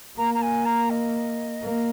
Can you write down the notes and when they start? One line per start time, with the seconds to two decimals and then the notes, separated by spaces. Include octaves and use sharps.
0.17 A#3 A#5
0.34 A#5
0.42 G#5
0.65 A#5
0.90 D#5
1.62 A#3